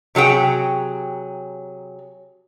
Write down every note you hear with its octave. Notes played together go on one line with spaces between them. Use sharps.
C3 F#3 G#4 G5